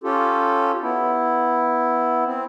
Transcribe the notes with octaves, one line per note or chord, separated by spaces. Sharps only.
C#4 F4 G4 A4
B3 E4
C4